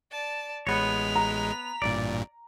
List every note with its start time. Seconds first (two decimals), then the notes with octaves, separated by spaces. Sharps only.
0.11 D5 A5
0.67 A1 G#3 B3 C#5 B6 F7
1.16 A#5
1.82 A1 G2 A#2 D5